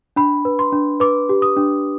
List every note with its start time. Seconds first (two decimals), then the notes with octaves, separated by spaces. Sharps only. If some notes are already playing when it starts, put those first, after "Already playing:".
0.16 D4 B5
0.45 B4
0.59 C6
0.72 D4
1.00 B4 D6
1.29 G4
1.42 D#6
1.57 D4